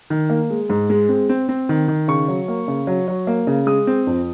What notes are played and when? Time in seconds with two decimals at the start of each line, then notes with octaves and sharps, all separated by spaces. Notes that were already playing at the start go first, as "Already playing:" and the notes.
0.10 D#3
0.30 A#3
0.50 G#3
0.70 G#2
0.90 G#3
1.09 C4
1.29 C4
1.49 C4
1.69 D#3
1.88 D#3
2.08 C#3 C#6
2.28 F#3
2.48 A#3
2.68 C#3
2.87 F#3
3.08 F#3
3.27 A#3
3.47 C#3
3.66 G#3 D#6
3.87 C4
4.07 F2